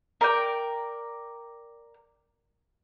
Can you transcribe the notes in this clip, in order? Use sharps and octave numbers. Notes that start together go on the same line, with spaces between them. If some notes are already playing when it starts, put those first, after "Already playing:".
A#4 D5 G5